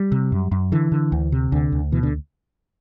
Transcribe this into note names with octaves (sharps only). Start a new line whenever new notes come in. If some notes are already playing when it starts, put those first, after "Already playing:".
Already playing: G3
C3
F#2
F#2
D3 E3
D3
D2
C3
D2 D3
D2
B2 E3
D3